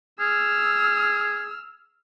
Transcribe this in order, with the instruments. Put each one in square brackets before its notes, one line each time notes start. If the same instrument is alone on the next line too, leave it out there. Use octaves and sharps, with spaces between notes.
[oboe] G#4 [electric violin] E6 F6